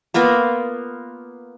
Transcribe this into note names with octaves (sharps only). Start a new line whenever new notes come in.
A#3 B3 F4 A#4